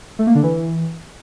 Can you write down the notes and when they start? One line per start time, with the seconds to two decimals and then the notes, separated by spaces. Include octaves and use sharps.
0.19 A3
0.27 A#3
0.35 D3
0.43 E3